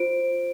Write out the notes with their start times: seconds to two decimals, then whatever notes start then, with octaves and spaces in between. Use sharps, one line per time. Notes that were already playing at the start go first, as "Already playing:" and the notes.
Already playing: F4 C5 D7